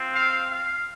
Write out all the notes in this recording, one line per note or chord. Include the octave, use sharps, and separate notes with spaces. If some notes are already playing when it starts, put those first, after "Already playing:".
Already playing: C4 F4
F5
F5